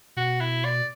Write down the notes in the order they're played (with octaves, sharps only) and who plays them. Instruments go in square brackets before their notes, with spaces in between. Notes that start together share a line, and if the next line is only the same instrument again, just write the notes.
[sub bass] B2 [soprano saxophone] F#4
[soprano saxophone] E4
D5